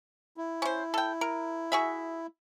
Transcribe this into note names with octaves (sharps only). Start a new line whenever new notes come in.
E4
C#4 C5
A4 G5
A#4
F#4 G#4 E5